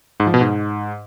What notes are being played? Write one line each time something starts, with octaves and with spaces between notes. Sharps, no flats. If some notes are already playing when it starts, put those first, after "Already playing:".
G#2
F3
B2
G#2